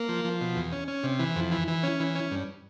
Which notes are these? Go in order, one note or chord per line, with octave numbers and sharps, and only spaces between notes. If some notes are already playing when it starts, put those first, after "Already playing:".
Already playing: A#3
F3
F3
B2
E2
C#4
C#4
C3
E3
F2
E3
E3
C#4
E3
C#4
G2